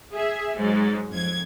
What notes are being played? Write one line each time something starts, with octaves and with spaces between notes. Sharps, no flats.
G#4 E5
G#2 F#3
F2 G#6